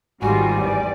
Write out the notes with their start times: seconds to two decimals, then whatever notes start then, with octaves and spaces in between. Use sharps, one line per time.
0.22 G#1 G#2 D#3 G3 F4 F#4 G#5
0.61 E2 D5